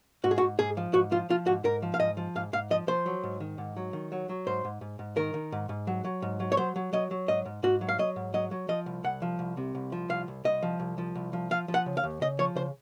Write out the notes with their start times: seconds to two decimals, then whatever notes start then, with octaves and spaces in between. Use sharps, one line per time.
0.24 G#2 F#4
0.31 G#4
0.38 F#4
0.41 G#2
0.59 G#2 G#4
0.77 F3
0.94 G#2 F#4
1.11 F3 F4
1.30 F3 F4
1.47 G#2 F#4
1.64 G#2 A#4
1.82 F3
1.94 F5
2.00 G#2 D#5
2.17 F3
2.35 G#2 F5
2.53 G#2 F5
2.71 F3 D#5
2.87 F3 C5
3.06 F#3
3.23 G#2
3.40 D#3
3.58 G#2
3.77 F#3
3.93 D#3
4.12 F#3
4.29 F#3
4.47 G#2 C5
4.65 G#2
4.81 G#2
4.99 G#2
5.17 D#3 A#4
5.34 D#3
5.52 G#2
5.69 G#2
5.87 F#3
6.04 F#3
6.22 G#2
6.40 F#3
6.52 C#5
6.57 F#3 C5
6.76 F#3
6.93 F#3 D#5
7.11 F#3
7.28 G#2 D#5
7.46 G#2
7.63 G#2 F#4
7.81 F#3
7.89 F5
7.99 F#3 D#5
8.16 G#2
8.34 F#3 D#5
8.51 F#3
8.68 F3 D#5
8.86 C2
9.04 C2 F#5
9.22 F3
9.39 C2
9.57 C3
9.75 C2
9.92 F3
10.09 C2 F5
10.28 C2
10.44 C2 D#5
10.63 F3
10.80 C2
10.98 F3
11.15 C2
11.33 F3
11.51 F3 F5
11.68 F3
11.74 F#5
11.86 C#3
11.97 F5
12.04 D#2
12.21 C#3 D#5
12.39 F3 C#5
12.56 C#3 C5